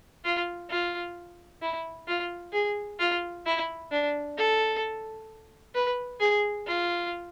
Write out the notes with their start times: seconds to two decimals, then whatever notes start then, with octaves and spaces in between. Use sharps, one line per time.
0.25 F4
0.70 F4
1.62 E4
2.08 F4
2.53 G#4
3.00 F4
3.46 E4
3.92 D4
4.38 A4
5.75 B4
6.20 G#4
6.67 F4